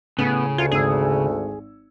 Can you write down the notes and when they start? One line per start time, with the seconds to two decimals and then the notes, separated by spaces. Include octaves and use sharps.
0.18 A2 C#3 B3
0.58 D2 F4 G#6 C#7
0.72 G#1 G#4 E6